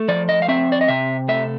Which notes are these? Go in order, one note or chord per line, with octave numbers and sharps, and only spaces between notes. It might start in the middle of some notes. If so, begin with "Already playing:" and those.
Already playing: A3
F3 D5
D#5
F5
C4 E5
D5
D#5
C3 E5
A3 E5